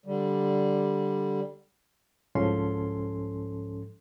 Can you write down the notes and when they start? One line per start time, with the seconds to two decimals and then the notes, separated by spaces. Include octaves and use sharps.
0.06 D3 G3
2.35 C2 G#2 F3 C#4 A4 C6